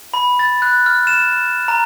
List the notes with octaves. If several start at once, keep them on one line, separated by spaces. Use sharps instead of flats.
B5
A6
F#6
F6
E7
A#5